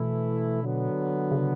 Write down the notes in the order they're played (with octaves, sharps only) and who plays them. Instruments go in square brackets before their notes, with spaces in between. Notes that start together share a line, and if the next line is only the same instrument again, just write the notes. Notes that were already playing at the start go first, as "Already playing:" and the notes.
Already playing: [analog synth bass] B2 [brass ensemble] E3 A3 E4
[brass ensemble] D3 F#3 B3
[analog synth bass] C#3